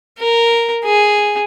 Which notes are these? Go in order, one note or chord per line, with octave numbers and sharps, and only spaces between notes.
A#4
G#4